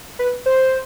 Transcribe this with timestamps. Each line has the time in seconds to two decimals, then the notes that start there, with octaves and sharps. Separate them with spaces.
0.19 B4
0.46 C5